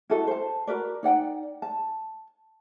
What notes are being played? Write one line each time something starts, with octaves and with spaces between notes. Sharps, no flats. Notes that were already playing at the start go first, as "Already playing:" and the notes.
E4 F#4 A4 D#5
C5 A5
F#4 A#4 B4 D5
D#4 D5 F#5 G5
A5